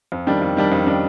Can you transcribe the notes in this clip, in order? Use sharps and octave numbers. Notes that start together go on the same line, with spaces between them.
F2
D#3 G3 D4
F2
D#3 G3 D4
F2
D#3 G3 D4